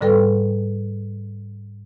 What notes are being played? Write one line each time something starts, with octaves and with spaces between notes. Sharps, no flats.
G#2 D3 G3 A4 B4 G5